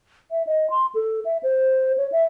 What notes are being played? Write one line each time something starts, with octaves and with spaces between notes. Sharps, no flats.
E5
D#5
C6
A4
E5
C5
C#5
E5